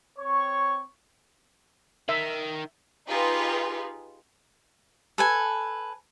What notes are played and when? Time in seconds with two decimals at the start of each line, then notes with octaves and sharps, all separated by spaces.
0.18 C4 C#5 C#6
2.09 D#3 E5
3.07 D#4 F4 G4 G#4 B4
5.18 A4 B4 G#5